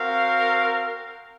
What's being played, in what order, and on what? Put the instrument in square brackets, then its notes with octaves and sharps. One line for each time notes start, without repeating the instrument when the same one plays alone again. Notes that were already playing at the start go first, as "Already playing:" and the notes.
Already playing: [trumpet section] C4 F#4 A#4 F5